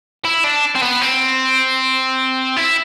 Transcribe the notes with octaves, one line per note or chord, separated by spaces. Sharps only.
E4
D4
C4
B3
C4
E4